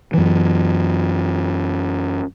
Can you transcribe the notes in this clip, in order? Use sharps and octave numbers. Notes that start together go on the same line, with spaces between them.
F#2 E3